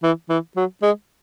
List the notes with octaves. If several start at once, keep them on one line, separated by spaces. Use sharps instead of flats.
E3
E3
F#3
G#3